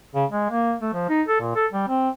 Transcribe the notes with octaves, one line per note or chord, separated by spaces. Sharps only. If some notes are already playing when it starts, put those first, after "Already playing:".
C#3
G#3
A#3
A3
F3
D#4
A4
A#2
A4
G3
C4